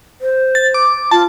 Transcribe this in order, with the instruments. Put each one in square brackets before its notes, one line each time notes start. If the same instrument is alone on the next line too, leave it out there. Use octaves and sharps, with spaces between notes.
[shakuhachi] C5
[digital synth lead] A6
D6
[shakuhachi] F4 [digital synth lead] A5